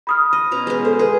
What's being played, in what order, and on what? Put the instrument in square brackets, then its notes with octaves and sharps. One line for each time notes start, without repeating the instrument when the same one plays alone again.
[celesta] B5 D#6 F6
[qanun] D#5
B2 C#4 A#5
G#3 B3
[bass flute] A4 [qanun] C5
[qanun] G#4 [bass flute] B4